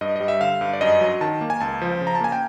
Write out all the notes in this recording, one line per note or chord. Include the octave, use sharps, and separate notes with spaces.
G2 D#5
G3 D#5
E5
D3 F5
G2
D5
F#2 D#5
F#3
D#3 A5
A#3
G#5
C#2 A5
F3
C#3
A#5
A5
A#3 G#5
G5